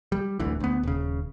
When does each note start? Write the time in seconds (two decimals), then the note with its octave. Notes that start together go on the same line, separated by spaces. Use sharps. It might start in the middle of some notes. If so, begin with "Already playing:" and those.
0.12 G3
0.39 D1 D2 D3 E3
0.60 D2 B3
0.83 D#1 C#3